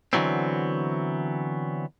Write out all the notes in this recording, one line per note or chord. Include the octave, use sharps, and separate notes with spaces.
D3 E3 F#3 B3 C4